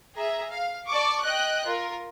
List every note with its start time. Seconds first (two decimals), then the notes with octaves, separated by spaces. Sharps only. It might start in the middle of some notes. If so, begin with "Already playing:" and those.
0.16 G#4 E5 A#5
0.50 F5
0.88 D5 A5 C#6 D6
1.22 D#5 G5 F#6
1.66 F4 A#4